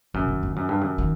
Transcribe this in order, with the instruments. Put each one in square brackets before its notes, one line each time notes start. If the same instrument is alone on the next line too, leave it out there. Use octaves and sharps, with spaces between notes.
[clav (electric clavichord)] F#2 [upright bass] C3
[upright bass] D#3
D#3
[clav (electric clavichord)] F#2
G2
F#2
[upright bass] D#3